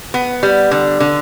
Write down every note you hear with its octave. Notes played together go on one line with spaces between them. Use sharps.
B3
G3
D3
D3